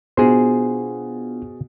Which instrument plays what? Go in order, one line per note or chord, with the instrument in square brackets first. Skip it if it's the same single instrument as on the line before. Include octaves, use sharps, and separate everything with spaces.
[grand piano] B2 [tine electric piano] B3 D4 F4 [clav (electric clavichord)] G#4 C5